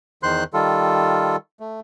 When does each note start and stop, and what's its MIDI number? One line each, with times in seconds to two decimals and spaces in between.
0.23 0.44 40
0.23 0.44 51
0.23 0.44 72
0.23 0.44 84
0.23 0.44 90
0.54 1.36 51
0.54 1.36 55
0.54 1.36 65
0.54 1.36 69
1.60 1.80 57